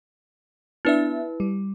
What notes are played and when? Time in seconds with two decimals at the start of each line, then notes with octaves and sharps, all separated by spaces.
0.85 B3 D4 E4 B4 E5
1.40 G3